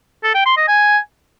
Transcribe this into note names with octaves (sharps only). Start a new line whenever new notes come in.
A4
G5
C6
D#5
G#5